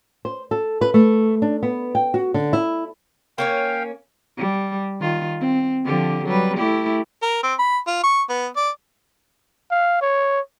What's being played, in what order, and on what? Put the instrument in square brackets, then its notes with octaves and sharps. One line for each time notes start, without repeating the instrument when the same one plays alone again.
[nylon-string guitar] C5
A4
B4
A3
D4
B3
G5
F#4
D3
E4
[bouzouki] A#3 C#4 C#5 [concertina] F5 G5
[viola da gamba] G3
D#3 F4
C4
D3 F3 G4
F#3 G3 B4
A3 E4 G4
[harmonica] A#4
C4
B5
F4
C#6
B3
D5
[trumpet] F5
C#5